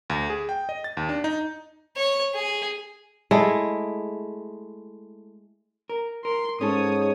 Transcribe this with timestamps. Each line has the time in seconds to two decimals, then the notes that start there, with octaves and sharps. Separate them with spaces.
0.10 D2
0.30 G#4
0.49 G5
0.69 D#5
0.84 A6
0.97 D#2
1.09 D4
1.24 D#4
1.97 C#5
2.35 G#4
3.31 G#3 A3 E4
5.90 A#4
6.25 A#4 C6
6.61 G#2 C#4 A4 C#5 D#6